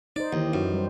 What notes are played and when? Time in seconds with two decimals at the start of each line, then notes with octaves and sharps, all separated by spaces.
0.16 D#4 C5 D5
0.33 D#2 E3 G4
0.54 F#2
0.74 G3 C5